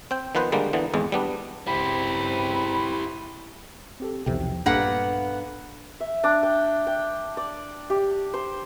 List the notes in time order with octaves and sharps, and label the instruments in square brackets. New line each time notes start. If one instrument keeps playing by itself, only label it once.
[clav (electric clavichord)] C4 G5
D#3 F3 B3 B4 C5
D3 G3 G#3 A#3
D3 E3 B3
G#1 E2 G#3
G3 B3 D4
[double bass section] C#2 G2 C4 [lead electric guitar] E4 G4 [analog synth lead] B5
[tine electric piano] C4 G4 A4
[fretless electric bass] B1 C3 E3 [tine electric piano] E2 F3 G5
[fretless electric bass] A#1 G2 [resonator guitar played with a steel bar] A#3 B3 F#5 [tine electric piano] D4 A4 B4
[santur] E5
D4
G5
G5
D5
G4
C5